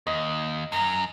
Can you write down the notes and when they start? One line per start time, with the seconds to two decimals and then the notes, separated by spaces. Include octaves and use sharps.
0.07 D#2 D#5
0.72 F#2 A#5